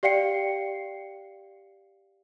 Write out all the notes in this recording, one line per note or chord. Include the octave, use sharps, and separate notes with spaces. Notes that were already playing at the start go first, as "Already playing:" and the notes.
G4 D5 F5 G5 C7 C#7